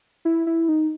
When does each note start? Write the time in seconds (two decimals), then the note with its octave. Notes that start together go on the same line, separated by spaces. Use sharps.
0.25 E4
0.47 E4
0.69 D#4